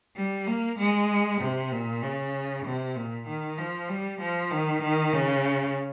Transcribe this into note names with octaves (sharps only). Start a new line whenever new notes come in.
G3
A#3
G#3
C3
A#2
C#3
C3
A#2
D#3
F3
G3
F3
D#3
D#3
C#3